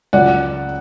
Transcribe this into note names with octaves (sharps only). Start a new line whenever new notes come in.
C#2 C#3 F#3 D5 F#5